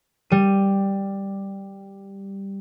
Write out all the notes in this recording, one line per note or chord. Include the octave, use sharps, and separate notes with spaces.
G3 D#7